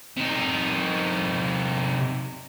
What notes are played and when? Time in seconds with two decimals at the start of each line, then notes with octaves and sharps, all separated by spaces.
0.17 C3 D#4